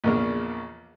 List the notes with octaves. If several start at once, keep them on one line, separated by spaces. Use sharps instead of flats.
A#1 E2 C#3 A#3 D4 F6